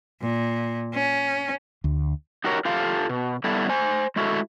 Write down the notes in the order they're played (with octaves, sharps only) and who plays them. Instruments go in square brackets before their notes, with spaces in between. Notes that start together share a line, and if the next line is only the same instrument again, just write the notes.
[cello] A#2
C#4
[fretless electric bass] D2
[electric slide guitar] D#4 F#4 G4 A#4 C#5
F4 G4 A4 F5
B2
G3 B3 E4 G4 A4
C5 G#5
G#3 A3 E4 F#4 A4